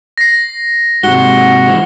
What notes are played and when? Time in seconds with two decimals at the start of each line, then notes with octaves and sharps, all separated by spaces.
0.18 A#6 C7
1.03 G#2 C3 F#4 G7
1.67 E3 F3 G#3